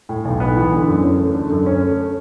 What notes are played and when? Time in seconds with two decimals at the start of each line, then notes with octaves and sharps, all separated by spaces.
0.09 A2
0.25 B1
0.40 B3
0.57 E3
0.72 D3
0.88 F#2
1.03 C#4
1.20 A3
1.34 D3
1.50 F#2
1.66 C#4
1.82 A3